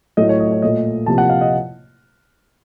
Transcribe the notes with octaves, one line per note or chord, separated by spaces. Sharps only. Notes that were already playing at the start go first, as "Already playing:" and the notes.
A2 F#3 A3 D#5
C#5
D#5
C#5
A#2 A3 D#5
C3 F3 A#3 A5
F#5
F5
D#5